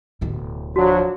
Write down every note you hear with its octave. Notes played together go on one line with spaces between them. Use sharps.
D1 B2
F3 F#3 D4 F#4